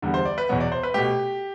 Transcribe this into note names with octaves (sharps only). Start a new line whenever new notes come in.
E2 D3 G3 B3
C5
D5
B4
E2 B2 F#3 B3
D5
C5
B4
B2 A3 G4